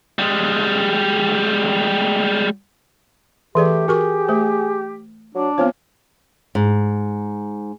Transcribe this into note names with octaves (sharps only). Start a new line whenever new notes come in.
G3 G#3
E3 A3 G4 G#4 D5
F#4 G#4 A#4 C#6
A3 C5
F#3 D4
F3 B3 C4 C#5
G#2